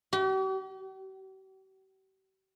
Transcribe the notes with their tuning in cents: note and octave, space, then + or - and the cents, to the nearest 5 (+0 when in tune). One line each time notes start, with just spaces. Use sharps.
G4 -45